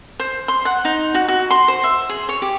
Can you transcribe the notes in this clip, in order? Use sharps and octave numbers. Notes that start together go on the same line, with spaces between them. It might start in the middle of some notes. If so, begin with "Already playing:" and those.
C5
C6
F#5
D#4
F#4
F#4
C6
C5
E5
G#4
C#5
G4